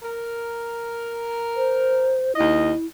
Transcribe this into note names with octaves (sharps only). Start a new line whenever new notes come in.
A#4
C5
D#2 E4 D#5